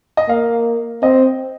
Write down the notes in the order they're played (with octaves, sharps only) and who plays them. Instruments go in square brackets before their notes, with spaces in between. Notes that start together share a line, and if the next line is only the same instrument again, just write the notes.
[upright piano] D#5
[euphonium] A#3 [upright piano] F5
[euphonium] C4 [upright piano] D#5